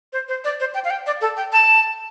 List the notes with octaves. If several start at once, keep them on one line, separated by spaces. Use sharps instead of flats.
C5
C5
D5
C5
G5
F5
G5
D5
A4
G5
A5